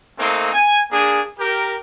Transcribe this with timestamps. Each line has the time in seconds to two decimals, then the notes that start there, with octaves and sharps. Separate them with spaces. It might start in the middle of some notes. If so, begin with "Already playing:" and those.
0.19 A3 A#3 C4 D#4
0.53 G#5
0.91 A#3 D4 G#4
1.39 G4 A#4